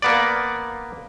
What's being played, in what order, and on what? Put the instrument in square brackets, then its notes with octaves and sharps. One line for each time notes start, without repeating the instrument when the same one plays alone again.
[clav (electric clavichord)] A#3 B3 D5